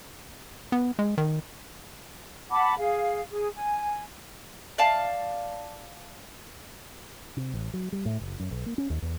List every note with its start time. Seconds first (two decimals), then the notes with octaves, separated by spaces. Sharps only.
0.72 B3
0.99 G#3
1.18 D#3
2.51 F#5 A5 B5 D6
2.77 G#4 F5
3.31 G#4
3.55 G#5
4.78 D5 F5 A5
7.37 C3
7.53 A1
7.73 F#3
7.92 G3
8.05 A2
8.19 F#1
8.40 F#2
8.51 B1
8.66 A#3
8.78 C#4
8.90 D#2
9.02 E2